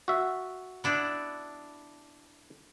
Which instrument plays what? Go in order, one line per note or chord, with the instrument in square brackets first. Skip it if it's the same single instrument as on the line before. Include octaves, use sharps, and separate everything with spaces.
[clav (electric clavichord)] F#4 E5
[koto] B3 D4 E4